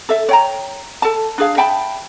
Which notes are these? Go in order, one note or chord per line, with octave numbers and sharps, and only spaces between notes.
A4 E5
C#5 G5 A#5
A4 A5
D4 G#4 F5
E5 G5 A5 B5